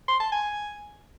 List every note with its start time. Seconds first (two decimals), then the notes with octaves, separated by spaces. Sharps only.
0.08 C6
0.20 A5
0.32 G#5